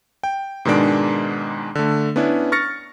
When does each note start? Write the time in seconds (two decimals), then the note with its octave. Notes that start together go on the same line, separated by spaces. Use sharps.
0.23 G5
0.65 G#2 B2 D#3 G#3 D4 D7
1.75 D3 A3
2.16 B3 C#4 D4 E4
2.52 C#6 F6 A6 A#6 C#7